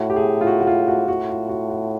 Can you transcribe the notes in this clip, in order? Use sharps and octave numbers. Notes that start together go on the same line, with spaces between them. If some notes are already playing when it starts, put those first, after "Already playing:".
Already playing: A2 F#4
G4
G#4
F4
F#4
F#4
F4
F#4
A2 F#4
F4
F#4
F#4